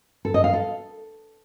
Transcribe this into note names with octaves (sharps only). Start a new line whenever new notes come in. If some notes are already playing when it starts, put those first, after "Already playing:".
A4
D#5
F5
A4